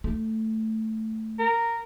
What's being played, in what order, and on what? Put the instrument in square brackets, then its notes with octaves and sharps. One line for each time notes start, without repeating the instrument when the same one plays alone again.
[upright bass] A3
[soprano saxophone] A#4